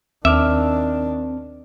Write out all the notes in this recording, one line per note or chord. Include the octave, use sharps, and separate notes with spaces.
D#2 D#3 C4 D4 E5 D6 F6